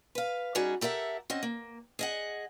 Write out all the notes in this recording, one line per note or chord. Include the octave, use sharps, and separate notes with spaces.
B4 F5
G3 C#4 D#4 F#4 G#4
G4 A4 A#4 E5 F#5
C4 C#4 D#5 F#5
A#3
G#4 D#5 F#5